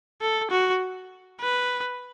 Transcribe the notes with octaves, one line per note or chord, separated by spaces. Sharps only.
A4
F#4
B4